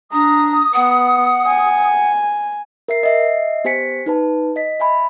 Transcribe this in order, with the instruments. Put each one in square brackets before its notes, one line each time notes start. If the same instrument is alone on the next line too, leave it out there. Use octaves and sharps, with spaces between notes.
[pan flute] D4 [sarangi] A#5 [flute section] D#6
[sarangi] B3 [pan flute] F#5
[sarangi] G#5
[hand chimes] A#4 E5 C7
D#5 E5 C7
B3 G4 C5 G#5 B6 C#7
D#4 B4 A5
D#5 B6
E5 G#5 B5